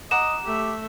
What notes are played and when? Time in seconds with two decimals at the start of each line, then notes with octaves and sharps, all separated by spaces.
0.11 D#5 F#5 A#5 D6 E7
0.45 A3 G4 E5